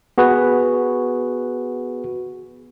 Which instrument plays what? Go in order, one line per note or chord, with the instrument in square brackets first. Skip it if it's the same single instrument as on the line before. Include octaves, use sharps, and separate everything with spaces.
[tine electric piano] B3 F#4 G#4 B4